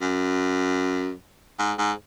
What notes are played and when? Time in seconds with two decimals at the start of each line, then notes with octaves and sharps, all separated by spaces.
0.01 F#2
1.59 G#2
1.78 G#2